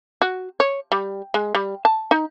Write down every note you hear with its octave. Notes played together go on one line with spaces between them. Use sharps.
F#4
C#5
G3
G#3
G3
A5
D#4